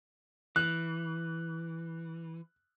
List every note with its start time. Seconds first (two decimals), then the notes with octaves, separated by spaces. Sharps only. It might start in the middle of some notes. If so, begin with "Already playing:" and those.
0.56 E3 F#6